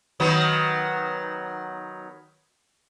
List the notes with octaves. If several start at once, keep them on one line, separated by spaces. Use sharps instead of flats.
D#3 F#3 B3